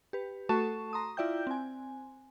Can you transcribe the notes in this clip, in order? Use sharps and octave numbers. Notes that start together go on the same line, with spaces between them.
G4 B4
A3 F#4 A4 A5 C#6 E7
A#5 C6 D#6
E4 F4 D5 E5 G5 G6
C4 G#5